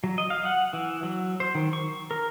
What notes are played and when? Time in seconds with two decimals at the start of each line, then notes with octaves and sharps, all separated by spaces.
0.04 F#3
0.18 D#5
0.30 F5
0.45 F#5
0.73 E3
1.03 F#3
1.40 C5
1.55 D#3
1.73 C#6
2.11 A#4